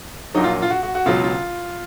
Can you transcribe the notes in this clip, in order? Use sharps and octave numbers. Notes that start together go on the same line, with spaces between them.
A#1 A#2 F#3 D#4
F4
F4
F#4
F#4
F#4
C#2 B2 F#3 F4
F4